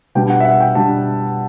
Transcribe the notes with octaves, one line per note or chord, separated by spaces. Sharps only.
B2 G3 D4 G5
F#5
E5
F#5
G5
B2 G3 D4 A5